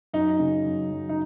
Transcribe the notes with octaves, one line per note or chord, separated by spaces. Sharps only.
F#2 D#4
C#3
F#2
F#2
D#4